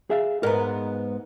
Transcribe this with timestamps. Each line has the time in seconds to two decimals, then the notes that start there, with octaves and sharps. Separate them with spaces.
0.10 G#4 E5 F5
0.43 G#2 B3 A#4 A#5